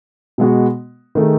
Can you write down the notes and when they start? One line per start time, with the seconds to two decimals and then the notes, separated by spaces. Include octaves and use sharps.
0.38 B2 G#3 B3 F#4
1.15 D#3 A3 D#4 G#4